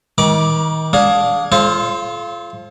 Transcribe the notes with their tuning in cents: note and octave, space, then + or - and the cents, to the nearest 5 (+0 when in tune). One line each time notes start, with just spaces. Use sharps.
D#3 +30 B5 -40 D6 +0
D4 -10 G#4 +0 F5 +30
F4 -20 A4 -35 C5 +25